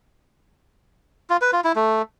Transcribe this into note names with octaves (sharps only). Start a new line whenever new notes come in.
F4
B4
F4
E4
A3